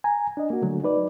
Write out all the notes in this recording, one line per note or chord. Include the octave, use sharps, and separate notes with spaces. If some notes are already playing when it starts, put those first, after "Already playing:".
G#5 A#5
D4 D#5
A#3 F#4
D3 F#3 A3
D#4 B4 D5